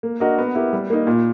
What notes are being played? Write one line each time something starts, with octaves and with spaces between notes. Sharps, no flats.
A#3
D4 F#4 A#4 D#5
B3
E4 G4 A#4
G3
A#3 D#4
A#2